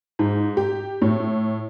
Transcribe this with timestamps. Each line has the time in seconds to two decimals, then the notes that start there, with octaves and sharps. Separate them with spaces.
0.19 G#2
0.57 G4
1.02 A2